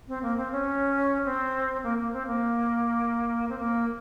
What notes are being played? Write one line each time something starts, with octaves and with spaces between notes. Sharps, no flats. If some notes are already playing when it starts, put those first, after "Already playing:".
C4
A#3
C4
C#4
C4
A#3
A#3
C4
A#3
C4
A#3